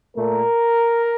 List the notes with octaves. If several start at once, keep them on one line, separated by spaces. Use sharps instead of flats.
A#2 A3 A#4